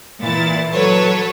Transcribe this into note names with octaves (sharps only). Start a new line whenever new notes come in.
A#2 E3 E4 A6
F#3 A4 B4 C#5